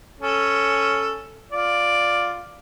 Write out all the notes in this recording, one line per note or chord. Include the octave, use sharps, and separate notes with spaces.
C#4 A4
F4 D5